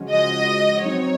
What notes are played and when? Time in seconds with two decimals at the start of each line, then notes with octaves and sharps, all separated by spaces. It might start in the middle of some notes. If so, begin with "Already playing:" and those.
Already playing: C#3 F3 G#3 C#4 F#4
0.11 C#3 F3 G#3 C#4 F#4 D#5
0.82 F#3 C4 D#4 C#5